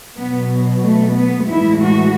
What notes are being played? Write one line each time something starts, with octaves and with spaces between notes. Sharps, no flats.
B2 F#3 B3
A3
B3
A2 E3 G#3 E4
F#4